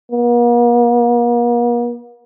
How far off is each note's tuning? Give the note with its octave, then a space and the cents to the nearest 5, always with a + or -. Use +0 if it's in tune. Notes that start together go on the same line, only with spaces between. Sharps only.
A#3 +45